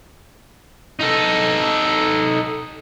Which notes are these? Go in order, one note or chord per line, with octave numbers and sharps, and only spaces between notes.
D#4 A4